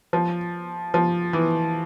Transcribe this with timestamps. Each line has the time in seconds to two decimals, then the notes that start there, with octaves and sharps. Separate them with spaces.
0.13 F3
0.94 F3
1.33 E3